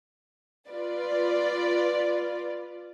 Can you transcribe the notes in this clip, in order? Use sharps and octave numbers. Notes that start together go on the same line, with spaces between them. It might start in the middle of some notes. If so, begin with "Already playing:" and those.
F4 B4 D5